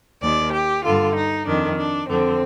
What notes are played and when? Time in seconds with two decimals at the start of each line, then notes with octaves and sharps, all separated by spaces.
0.22 D#2 D#3 D5
0.53 G4
0.84 G2 D3 F4
1.15 D#4
1.47 F2 D#3 D4
1.78 D4
2.09 F2 D3 C4